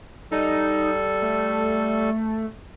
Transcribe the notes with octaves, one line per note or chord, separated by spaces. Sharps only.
G3 D#4 A4
A3